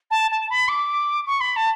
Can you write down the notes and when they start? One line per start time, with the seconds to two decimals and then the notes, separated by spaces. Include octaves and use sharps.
0.10 A5
0.30 A5
0.50 B5
0.68 D6
1.26 C#6
1.40 B5
1.56 A5